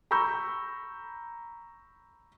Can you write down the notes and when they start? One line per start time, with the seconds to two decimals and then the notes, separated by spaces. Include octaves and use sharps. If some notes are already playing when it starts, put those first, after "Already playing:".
0.11 A#5 B5 C#6 E6 G6